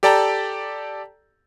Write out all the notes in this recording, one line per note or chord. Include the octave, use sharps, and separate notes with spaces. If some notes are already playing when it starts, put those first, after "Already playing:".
G4 A4 D5 G5 A5 A#5